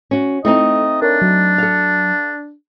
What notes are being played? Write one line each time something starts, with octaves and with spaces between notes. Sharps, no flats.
C#4 F#4
A3 C4 D#4 E4 A4 D#5
D4 A#4 C#5
F#3
A4 F5